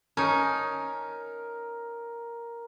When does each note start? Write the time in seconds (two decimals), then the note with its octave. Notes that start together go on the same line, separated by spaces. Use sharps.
0.17 C#4 D#4 A#4